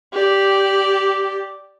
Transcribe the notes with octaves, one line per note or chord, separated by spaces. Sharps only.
G4 D5